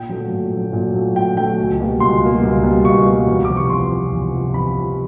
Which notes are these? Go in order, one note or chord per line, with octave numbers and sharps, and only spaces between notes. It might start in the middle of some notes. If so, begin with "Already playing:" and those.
Already playing: A#2 G5
F#3 A3
A#2
F#3 A3
A#2
F#3 A3
A#2 G5
F#3 A3 G5
C#2
B2 G3 A#3
C#2 C6
B2 G3 A#3
C#2
B2 G3 A#3
C#2 C#6
B2 G3 A#3
E2
C3 F3 D6
C#6
E2 C6
C3 F3
E2
C3 F3
E2 B5
C3 F3